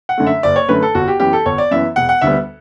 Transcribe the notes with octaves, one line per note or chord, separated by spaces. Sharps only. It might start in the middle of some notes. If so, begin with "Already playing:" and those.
F#5
F#2 D3 A3
E5
F#1 D5
C#5
F#2 D3 A3 B4
A4
G1 F#4
G4
F#2 E3 B3 G4
A4
G1 C#5
D5
F#2 E3 B3 E5
E1 F#5
F#5
D2 D3 G3 B3 E5